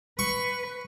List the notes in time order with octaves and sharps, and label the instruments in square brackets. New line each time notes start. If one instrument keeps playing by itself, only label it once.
[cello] B4 [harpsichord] C#6